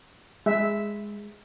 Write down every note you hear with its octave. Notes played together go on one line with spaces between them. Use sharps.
G#3 E5